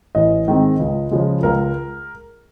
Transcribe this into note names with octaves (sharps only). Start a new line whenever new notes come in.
A1 D#5
G#2 D#3 G#3 C4
C#2
C#3 F3 G#3
C#2 A#4